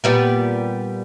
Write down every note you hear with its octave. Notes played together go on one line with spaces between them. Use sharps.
A#2 G3 B3